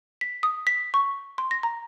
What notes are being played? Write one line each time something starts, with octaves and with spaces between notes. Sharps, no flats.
B6
D#6
B6
C#6
C6
A#6
A#5